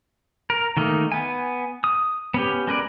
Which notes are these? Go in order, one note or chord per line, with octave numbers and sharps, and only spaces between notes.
A#4
D#3 A3 A#3 D#4
B3 G#5
D#6
B3 C#4 G4
G#3 A#4 B4 D5